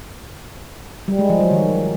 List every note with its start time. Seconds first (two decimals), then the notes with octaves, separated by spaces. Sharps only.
1.08 G3
1.19 G#3
1.29 F3
1.40 F#3
1.51 D#3